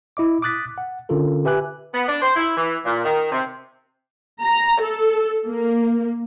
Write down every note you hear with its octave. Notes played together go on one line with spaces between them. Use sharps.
E4 D#5 D6
D6 D#6 F#6 A6 B6
F#5
D3 C#4 F4 A4 A#4
G4 B4 E5 G#5 D6 F#6
B3
D4
C5
E4
E3
A#2
D#3
C3
A#5
A4
A#3